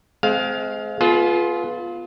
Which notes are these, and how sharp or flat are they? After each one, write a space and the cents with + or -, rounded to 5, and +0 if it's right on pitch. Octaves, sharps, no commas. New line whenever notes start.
G#3 +35 C4 -10 F5 +10
B3 +0 F4 +0 G#4 +40